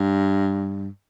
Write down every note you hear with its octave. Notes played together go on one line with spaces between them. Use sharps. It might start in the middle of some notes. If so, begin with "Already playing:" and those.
Already playing: G2